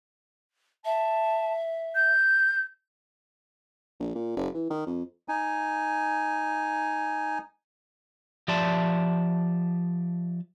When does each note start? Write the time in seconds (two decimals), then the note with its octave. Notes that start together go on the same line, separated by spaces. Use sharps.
0.85 E5 A5
1.95 G6
4.00 A#1
4.15 A#2
4.37 F#1
4.55 E3
4.70 D#3
4.87 F2
5.29 D#4 G#5
8.48 F3 G4 D5 E5 A5 C6